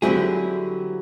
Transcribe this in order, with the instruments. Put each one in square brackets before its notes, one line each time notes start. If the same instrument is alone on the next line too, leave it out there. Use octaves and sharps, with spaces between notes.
[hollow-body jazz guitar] D3 G3 C4 E4 G#4 [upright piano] F#3